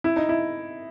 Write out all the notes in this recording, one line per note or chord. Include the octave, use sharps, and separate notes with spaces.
E4
D#4
E4